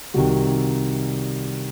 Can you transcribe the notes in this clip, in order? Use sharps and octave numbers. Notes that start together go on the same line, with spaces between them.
C2 C3 D#3 F#4